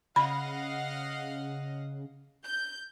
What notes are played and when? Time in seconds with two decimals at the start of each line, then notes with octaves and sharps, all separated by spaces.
0.16 C#3 D#5 F5 F#5 B5
2.45 G6